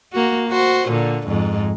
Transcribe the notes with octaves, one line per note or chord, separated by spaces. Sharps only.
A#3 F#4
F#4 C5
A#2 D3
F2 G#2